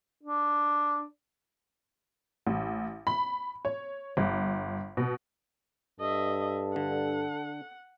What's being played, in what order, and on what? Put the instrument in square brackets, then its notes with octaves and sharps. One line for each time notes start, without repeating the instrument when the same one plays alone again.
[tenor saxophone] D4
[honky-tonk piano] A1
B5
C#5
G1
B2
[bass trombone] G2 [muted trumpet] A4 [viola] D#5 E5
[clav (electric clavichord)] D3 [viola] F#5